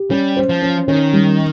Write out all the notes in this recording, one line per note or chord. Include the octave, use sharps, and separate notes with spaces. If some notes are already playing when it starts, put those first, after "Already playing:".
Already playing: G4
G3 C#4
C5
F3
C#4
D#3 C#4
G3